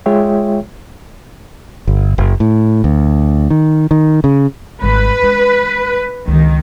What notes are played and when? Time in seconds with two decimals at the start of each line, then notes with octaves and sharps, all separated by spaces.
0.06 G#3 F4 G#4 C#5 E5 G5
1.87 G1
2.18 F#1
2.40 A2
2.84 D2
3.50 D#3
3.91 D#3
4.24 C#3
4.82 G#1 G2 B4
5.22 G#3 D4
6.28 C#2 D#3